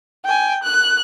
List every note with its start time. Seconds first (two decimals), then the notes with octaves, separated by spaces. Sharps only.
0.25 G5 G#5
0.63 F#6